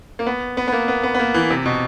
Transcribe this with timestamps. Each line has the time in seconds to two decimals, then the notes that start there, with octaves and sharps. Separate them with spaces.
0.19 A#3
0.26 B3
0.57 B3
0.68 B3
0.72 A#3
0.88 B3
1.03 B3
1.14 B3
1.19 A#3
1.34 E3
1.50 C3
1.66 B2